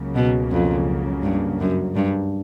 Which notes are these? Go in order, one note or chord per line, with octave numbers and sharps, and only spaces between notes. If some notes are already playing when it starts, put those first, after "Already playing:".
Already playing: C#2 C#3 F#3 A#3
B2
F2
G2
F#2
G2